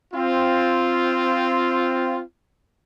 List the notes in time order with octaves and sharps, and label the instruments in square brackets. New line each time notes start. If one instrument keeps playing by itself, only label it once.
[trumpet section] C4 F4